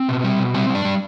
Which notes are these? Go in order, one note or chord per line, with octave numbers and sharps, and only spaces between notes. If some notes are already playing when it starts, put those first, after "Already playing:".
Already playing: C4
B2
G3
B2
G3 C4
G3
D4
G3